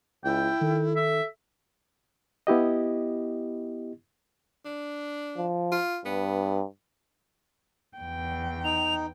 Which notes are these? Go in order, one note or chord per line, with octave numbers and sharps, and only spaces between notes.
C#2 E4 G5
D#3 A4
E5
B3 E4 G4 D#5
D4
F3
F4
G2 B3
E2 G5
D#4 F7